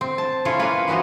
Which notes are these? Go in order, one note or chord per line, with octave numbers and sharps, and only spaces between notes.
C4
A5
C#4 E4 F4 A4 C#5
A#3 F4 B4
E3 F3 B3 F#4 D#5